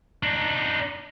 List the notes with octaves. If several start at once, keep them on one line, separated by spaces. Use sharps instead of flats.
D4 D#4